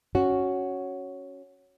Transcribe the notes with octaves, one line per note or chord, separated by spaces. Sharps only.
C#4 F#4